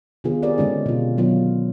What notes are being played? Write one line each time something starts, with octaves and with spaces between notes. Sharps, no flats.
C3 D#3 B3 F4 G#4
C4 G4 G#4 A#4 D5
D3 G#3 C#4 D#4
B2 F4
D#3 F#3 B3 F4